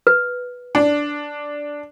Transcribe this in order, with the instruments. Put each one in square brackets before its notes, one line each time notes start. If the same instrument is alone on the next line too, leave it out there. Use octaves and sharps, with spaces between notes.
[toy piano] B4
[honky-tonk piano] D4